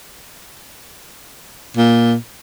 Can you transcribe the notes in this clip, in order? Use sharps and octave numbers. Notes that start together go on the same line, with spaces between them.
A#2